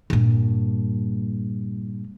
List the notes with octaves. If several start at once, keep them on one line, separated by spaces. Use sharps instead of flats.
G2 A#2